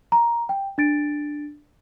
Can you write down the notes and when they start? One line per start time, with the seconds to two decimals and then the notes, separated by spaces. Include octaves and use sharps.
0.12 A#5
0.49 G5
0.78 D4 A6 D7